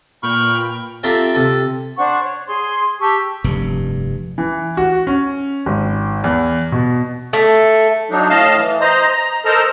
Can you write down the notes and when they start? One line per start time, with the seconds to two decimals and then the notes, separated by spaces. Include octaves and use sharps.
0.23 A#2 B4 G5 B5 C#6 F6
1.03 C4 F4 G4 A4 E5 A#5
1.35 C3 A4
1.96 D4 C5 F#5 C#6
2.24 C#5
2.47 G#4 C6
3.00 G4 A5 C#6 E6
3.44 F1 G2
4.38 E3
4.77 F#4
5.07 C#4
5.66 G#1
6.24 E2
6.72 B2
7.33 A3
8.10 F#3 D4 D#4
8.30 A2 D#5 F5 A5
8.57 E3
8.81 C5 D#5 A#5
9.11 A#5
9.45 A4 A#4 C5 D#5 A5 A#5